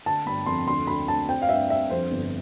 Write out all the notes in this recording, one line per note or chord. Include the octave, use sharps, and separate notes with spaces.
D3 A5
G1 B5
F2 C6
D2 C6
D2 B5
D2 A5
C4 G5
F5
G2 E5
G2 E5
F2 C5
G1